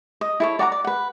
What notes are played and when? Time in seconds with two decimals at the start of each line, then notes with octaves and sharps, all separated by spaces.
0.21 D#5
0.40 E4 A4 C#5
0.59 D5 F#5 A#5 D6
0.72 D5
0.84 B4 F#5